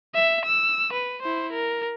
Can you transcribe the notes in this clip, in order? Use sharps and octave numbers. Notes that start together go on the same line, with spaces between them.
E5
E6
B4
E4 C5
A#4